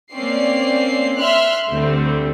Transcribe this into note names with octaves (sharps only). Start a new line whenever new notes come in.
A#3 C4 C#4 D5 C7
E5 C6 F6 F#6
D2 D3 G3 A3 C4